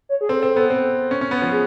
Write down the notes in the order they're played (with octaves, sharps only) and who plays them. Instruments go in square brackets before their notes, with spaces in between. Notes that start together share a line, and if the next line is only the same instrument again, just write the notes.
[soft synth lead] C#5
G#4
[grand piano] C4 [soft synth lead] A4
[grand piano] C4
B3
C4
C#4
C#4
B3
F3
[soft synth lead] G#4